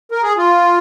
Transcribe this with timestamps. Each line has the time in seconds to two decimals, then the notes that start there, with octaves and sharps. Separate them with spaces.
0.11 A#4
0.23 G#4
0.37 F4